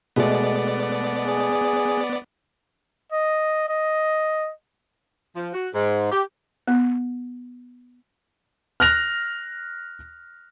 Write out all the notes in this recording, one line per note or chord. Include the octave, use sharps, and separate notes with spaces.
B2 G#3 A3 B3 D5
G#4
D#5
D#5
F3
F#4
G#2
G4
B3
F6 F#6 A#6 F7